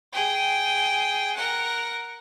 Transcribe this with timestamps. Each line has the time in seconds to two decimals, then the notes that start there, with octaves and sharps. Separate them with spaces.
0.13 G#4 G5
1.36 A#4 F#5